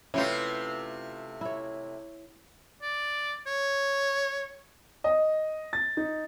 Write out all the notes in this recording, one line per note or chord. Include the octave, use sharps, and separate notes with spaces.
C3 A3 C#4 E4 F4 G4 B4
E4 C#5
D5
C#5
D#5
A6
D#4